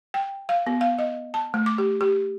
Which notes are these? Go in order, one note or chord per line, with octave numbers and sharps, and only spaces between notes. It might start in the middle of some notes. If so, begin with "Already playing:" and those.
G5
F5
B3
F5
D#5
A5
A3
D6
G4
G4